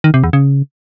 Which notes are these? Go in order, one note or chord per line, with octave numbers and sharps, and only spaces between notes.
D#3
C3
E2
C#3